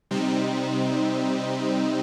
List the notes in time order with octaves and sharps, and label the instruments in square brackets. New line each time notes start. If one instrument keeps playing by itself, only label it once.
[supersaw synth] C3 G3 C4 D#4